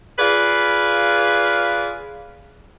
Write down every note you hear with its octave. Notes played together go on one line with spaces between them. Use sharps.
F4 G#4 B4 D5 F5